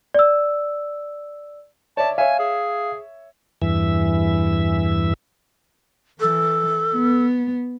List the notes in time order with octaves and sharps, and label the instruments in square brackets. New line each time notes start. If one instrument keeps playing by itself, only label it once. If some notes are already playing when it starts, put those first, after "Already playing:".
[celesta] D5 E6
[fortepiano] C#5 D5 E5 [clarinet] A5
[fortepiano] C#5 E5 [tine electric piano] F5 [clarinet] G#5
[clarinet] G#4
[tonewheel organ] E2 G2 E3 E5
[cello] E3 [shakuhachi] A4
[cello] B3